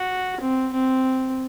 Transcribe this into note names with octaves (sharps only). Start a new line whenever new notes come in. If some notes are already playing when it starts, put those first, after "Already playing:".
Already playing: F#4
C4
C4